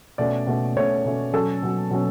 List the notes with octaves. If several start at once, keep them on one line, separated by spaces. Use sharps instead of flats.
B2 A3 C#4 D5
B2 A3 C#4
B2 A3 C#4 C#5
B2 A3 C#4
B2 F#3 C#4 A4
B2 F#3 C#4
B2 F#3 C#4